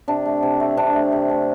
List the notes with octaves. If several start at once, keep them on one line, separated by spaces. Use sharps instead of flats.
C3 D4
A3
C3
A3
C3 D4
A3
C3
A3